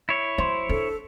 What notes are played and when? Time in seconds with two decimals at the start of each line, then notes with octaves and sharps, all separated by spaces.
0.09 E4 C#5
0.38 F#3 C5
0.69 D4 A4